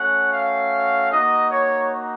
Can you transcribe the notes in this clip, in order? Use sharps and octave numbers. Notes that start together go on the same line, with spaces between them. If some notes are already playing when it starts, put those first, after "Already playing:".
Already playing: A3 C#4 F#4 F#5
F5
A#3 D#4 F#4 D#5
C#5